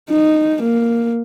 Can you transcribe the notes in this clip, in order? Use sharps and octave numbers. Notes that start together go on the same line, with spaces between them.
D#4
A#3